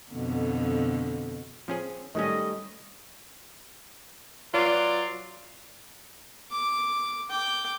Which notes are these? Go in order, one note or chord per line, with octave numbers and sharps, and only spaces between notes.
F2 B2 D3
F3 C4 C#4 G#4
D#3 F#3 G3 A3 C#4 D#5
F#3 F4 B4 D5
D6
G5 D6